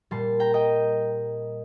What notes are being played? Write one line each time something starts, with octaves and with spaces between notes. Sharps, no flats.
A#2 G3 A5 C6
G5 A#5
D#5 G5